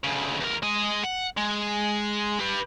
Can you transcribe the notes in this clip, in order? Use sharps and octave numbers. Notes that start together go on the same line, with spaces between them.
D2 C#3
E2 A#4
G#3 D#5
F#5
G#3
G4 B4